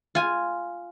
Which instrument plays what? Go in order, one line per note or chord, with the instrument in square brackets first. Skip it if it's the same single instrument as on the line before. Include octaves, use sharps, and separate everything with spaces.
[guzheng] F4 G#5